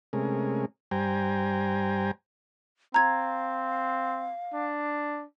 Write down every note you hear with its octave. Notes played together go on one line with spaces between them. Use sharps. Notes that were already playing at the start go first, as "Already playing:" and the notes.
C3 G#3 A3 C#4 G#4 A#4
G2 G3 C5 G5 G#5 A#5
C4 F5 A#5 G#6
D4